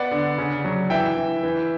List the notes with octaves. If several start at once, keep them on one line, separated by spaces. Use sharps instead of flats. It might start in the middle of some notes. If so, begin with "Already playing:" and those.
Already playing: B3 D5 F#5
D3
C#3
F#3
E3 E5 G5
E3
E3